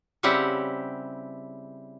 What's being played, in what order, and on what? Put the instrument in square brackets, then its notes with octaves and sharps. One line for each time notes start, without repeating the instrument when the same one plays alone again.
[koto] C#3 G3 C4 E4 G4 F#5